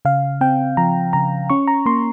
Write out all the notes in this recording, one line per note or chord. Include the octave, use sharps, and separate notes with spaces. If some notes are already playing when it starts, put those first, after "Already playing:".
C#3 F5
C4 G5
F3 A#5
C#3 A#5
C#4 C#6
A#5
A#3 C6